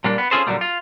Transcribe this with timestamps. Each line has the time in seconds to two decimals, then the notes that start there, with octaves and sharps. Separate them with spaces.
0.04 A#2 G3 A#3 D4
0.18 B3
0.31 C#4 F4 G#4 A4 C5
0.47 A#2 D3 E3 F#3 G3 A#3
0.61 F4